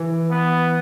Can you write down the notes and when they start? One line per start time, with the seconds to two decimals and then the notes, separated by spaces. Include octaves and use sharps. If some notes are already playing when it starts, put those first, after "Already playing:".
Already playing: E3
0.31 B3